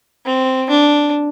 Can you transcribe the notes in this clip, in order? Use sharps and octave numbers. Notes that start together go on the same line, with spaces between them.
C4
D4